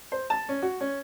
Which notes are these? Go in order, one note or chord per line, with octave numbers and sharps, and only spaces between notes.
C5
A5
C#4
F#4
C#4